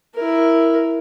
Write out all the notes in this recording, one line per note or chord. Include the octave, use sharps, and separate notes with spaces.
E4 A#4